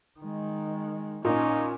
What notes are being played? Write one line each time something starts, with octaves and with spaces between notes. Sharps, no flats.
D#3 G#3
A#2 C#4 D#4